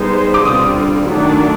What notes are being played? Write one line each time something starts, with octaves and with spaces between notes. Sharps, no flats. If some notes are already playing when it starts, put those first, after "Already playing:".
Already playing: G3 B3 D#4 G#4 C5
D6
D3 G3 C4 F4 D#6
D#3 F#3 A3 D4 F#4